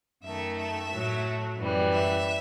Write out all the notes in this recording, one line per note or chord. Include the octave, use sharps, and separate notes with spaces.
F#2 D#3 A3 E5
E5
A2 F#3 A3
F#2 E3 G3
E5